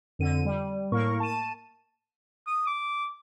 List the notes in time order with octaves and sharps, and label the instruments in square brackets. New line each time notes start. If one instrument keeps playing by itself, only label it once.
[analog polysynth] F2 D3 D#7
G3
A2 A#3 A#4 C#6
A5 D#7
[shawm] D#6
D6